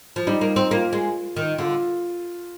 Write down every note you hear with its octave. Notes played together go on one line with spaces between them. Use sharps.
F3
G3 D#4
A#3
C4
A#3 F4
G#3
D#3
D3 F4